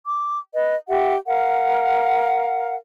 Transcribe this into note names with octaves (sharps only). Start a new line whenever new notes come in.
D6
B4 D#5
G4 E5 F#5
A#4 F5 F#5